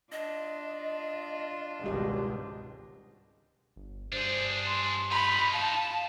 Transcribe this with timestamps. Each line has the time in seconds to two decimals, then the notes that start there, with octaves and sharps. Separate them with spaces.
0.12 D4 F4 D#5
1.83 G#1 C#2 B2 G3 G4 D#5
3.76 G1
4.12 G2 D4 G#4 C5
4.66 C6
5.11 D#4 F4 B5
5.54 F5 A5